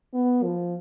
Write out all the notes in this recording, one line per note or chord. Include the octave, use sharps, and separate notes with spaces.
B3
F3